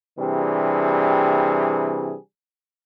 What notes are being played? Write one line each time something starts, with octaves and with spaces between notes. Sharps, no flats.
C3 E3 G3 D4 G#4